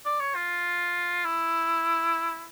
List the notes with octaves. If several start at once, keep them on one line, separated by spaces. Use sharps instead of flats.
D5
C#5
F4
E4